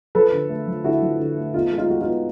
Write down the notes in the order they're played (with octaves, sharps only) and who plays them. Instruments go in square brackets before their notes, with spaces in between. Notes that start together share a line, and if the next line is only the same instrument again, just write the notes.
[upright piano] F3 A4 B4
D3
A3
F3
D3 E4 F#4
F3
D3
A3
B3 D#4 F4
G#3
D#4 F4
G#3 F#4
D#4 F4
B3